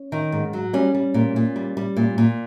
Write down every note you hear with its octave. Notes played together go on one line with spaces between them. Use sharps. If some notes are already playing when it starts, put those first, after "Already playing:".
Already playing: C#4
D#3
G#2
F#3
G3 C#4
G3
A#2
A#2
G3
G3
A#2
A#2